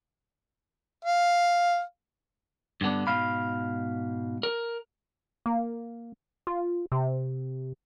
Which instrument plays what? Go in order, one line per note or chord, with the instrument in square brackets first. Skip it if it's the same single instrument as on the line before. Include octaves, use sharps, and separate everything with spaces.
[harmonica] F5
[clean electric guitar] G2 D3 B3 D4
G#2 B2 F5 B5
A#4
[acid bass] A#3
F4
C3